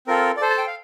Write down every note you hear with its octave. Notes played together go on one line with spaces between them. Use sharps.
C4 F4 A4 A#4
D5
A4 C5
A5
G5
F5